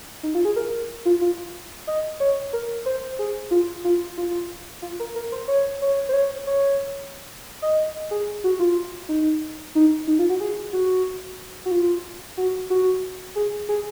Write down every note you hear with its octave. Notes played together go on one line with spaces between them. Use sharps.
D#4
F4
G#4
A#4
F4
F4
D#5
C#5
A#4
C5
G#4
F4
F4
F4
F4
A#4
A#4
C5
C#5
C#5
C5
C#5
C#5
D#5
G#4
F#4
F4
D#4
D#4
D#4
F4
F#4
G#4
F#4
F#4
F4
F#4
F#4
G#4
G#4